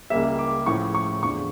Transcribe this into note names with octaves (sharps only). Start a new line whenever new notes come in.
C#2 C#3 G3 A#3 E5
D6
A2 F3 C#4 E4 C#6
C#6
E2 D3 F3 C#6